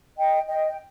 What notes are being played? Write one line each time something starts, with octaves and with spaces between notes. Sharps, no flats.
D#5 G5
D#5 G5
G5